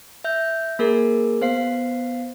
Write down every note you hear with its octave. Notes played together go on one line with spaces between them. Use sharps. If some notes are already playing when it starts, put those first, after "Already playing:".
E5 G6
A#3 G#4 A#4
B3 C5 F5 C7